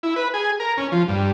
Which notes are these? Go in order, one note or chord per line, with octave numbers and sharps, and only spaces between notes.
E4
B4
G#4
A#4
C#4
F3
G2